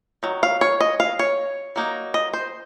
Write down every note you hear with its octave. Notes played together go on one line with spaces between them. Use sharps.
D#3 F#3
F5
C#5
D#5
F5
C#5
F#3 A#3 D#4
D#5
C5